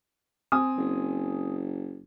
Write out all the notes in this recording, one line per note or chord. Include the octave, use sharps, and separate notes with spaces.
C4 G#5 D#6
F#1